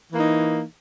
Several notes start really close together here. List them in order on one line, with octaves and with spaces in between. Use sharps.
E3 A#3 D#4